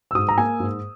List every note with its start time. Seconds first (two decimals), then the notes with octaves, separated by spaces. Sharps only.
0.11 E6
0.15 G#2 D#6
0.29 A#5
0.38 A#3 G#5
0.60 G#2